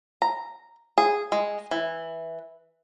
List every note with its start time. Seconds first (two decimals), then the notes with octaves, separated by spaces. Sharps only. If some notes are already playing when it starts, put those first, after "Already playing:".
0.22 A#5
0.98 G#4
1.32 G#3
1.71 E3